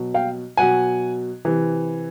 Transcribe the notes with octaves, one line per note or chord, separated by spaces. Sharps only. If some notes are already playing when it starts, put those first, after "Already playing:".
Already playing: B2 F#3
F5 G5
B2 F#3 F#5 G#5
C3 E3